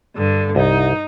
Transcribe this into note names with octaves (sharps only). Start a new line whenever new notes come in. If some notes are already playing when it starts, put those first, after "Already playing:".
G2 D3
C2 D#4